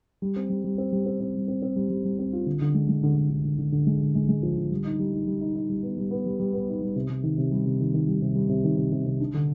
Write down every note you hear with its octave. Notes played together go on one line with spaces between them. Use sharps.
G3
C4
G3
G3
C4
G3
C4
C4
G3
C4
C4
G3
G3
G3
C4
F4
D3
D3
G#3
G#3
D3
D3
D3
D3
D3
D3
G#3
D3
G#3
G#3
F3
D3
G3
D#4
G3
D#4
G3
D#4
D#4
G3
B3
G3
B3
G3
G3
B3
D#4
G3
C3
C3
D#3
C3
G3
C3
D#3
D#3
G3
C3
G3
C3
D#3
C3
C3
C3
D4
D3